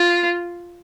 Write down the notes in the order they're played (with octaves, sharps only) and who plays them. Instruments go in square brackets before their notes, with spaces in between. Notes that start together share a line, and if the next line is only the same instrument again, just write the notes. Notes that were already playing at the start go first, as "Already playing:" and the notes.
Already playing: [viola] F4